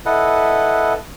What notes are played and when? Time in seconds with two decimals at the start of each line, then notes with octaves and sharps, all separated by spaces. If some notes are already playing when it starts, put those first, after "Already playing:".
0.06 E4 A4 B4 D#5 F#5